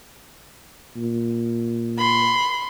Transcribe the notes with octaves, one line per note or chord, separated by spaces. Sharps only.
A#2
B5 C6